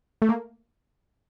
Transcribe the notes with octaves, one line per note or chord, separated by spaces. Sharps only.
A3
A#3